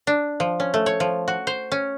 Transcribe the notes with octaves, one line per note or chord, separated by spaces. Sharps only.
D4
F3
C#4
A3
C#5
F3
F#4
C5
C#4